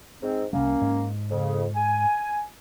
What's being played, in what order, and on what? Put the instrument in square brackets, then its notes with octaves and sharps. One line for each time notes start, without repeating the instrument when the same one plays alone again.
[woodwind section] G#2 C4
[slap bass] C2 C3 G3 [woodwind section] A#3 C#4
[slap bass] G#2
[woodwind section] F2 C#3
G#5